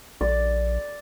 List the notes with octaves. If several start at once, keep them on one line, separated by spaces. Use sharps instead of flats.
A#1 D5